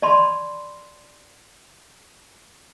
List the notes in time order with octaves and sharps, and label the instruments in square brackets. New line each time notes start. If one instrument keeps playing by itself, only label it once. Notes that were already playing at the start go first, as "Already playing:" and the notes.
[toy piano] D5 A5 B5 C6